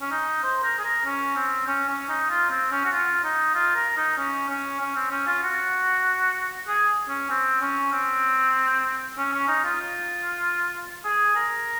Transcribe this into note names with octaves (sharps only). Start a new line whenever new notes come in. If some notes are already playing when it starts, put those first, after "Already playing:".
C#4
D#4
C5
A#4
G#4
A#4
C#4
C4
C#4
C#4
D#4
F4
C4
C#4
F#4
F4
D#4
F4
A#4
D#4
C#4
C#4
C#4
C4
C#4
F4
F#4
G#4
C#4
C4
C#4
C4
C#4
C#4
D#4
F4
G#4
A#4